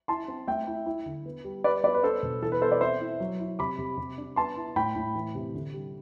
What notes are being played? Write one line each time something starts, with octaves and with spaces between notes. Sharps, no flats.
E4 A5 C6
C4
A3 E5 G5
E4
E4
D3
B3
G3
G3 B4 D5
B3 B4 D5
B4
D4 A4 C5
B2
E3 A4
B4
B3 A4 C5
B4 D5
C4 C5 E5
E4
F#3
E4
C3 B5 D6
C3
C3
D4
B3 A5 C6
E4
A2 G5 B5
A2
E3
C3
D3
G3